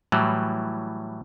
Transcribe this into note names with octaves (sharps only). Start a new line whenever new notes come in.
A2 E3 F#3 G3